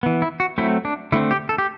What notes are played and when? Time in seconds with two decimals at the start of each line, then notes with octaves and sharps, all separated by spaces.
0.03 E3 B3
0.22 E4
0.40 F#4
0.58 F#3 A3 C4 E4
0.85 D4
1.12 D3 A3 C4 E4
1.31 G4
1.49 A4
1.58 G4